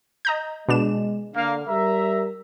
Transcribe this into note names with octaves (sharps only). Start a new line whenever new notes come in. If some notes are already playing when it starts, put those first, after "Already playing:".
D#5 A#5 G6
B2 G#3 D4 E7
D3 A#3 F5
G3 A#4 E5 A#5